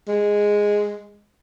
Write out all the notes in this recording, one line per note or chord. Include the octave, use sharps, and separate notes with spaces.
G#3